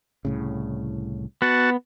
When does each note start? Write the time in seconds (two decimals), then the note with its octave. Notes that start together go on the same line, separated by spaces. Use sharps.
0.25 C2 A2 C#3
1.42 B3 F#4 A5